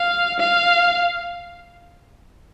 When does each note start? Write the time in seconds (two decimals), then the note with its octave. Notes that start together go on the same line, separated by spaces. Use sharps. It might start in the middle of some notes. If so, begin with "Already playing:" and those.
Already playing: F5
0.40 F5